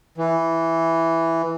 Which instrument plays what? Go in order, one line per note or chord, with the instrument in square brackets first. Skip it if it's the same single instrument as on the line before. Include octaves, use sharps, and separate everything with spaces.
[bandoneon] E3